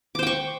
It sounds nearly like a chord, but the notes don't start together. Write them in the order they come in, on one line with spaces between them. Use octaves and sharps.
D6 C5 G5 C#6